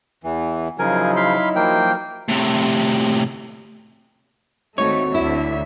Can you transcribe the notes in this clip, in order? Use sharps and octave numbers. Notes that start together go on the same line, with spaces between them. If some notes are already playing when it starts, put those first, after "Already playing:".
E2 E3
C#3 F3 F#3 D#4 E4 A#4 G#5
F5 B5 C6
F3 A#3 A#4 G5
A2 C3
D#2 G#2 A3 C4 D#4 F#4 C#5
D2 D3 E4 E5